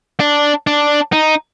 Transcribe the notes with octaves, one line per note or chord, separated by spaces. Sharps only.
D4
D4
D#4